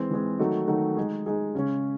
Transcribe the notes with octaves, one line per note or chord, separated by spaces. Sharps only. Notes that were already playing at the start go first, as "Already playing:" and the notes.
Already playing: E3 G#3 C4
E3 G#3 C4
D#3 F#3 A3 D#4 F#4
D#3 F#3 A3 D#4 F#4
G#3 D#4 G#4
G#3 D#4 G#4
C#3 G#3 C#4